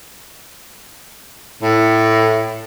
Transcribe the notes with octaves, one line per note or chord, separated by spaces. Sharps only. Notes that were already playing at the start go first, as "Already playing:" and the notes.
A2